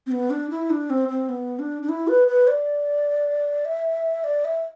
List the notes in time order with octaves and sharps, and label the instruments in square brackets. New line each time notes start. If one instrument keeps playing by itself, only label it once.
[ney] C4
B3
D4
E4
D4
C4
C4
B3
D4
D4
E4
B4
B4
D5
E5
D5
E5